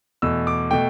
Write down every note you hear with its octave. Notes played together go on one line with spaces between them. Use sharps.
E2 B2 A3 E6
D6
B2 A3 G5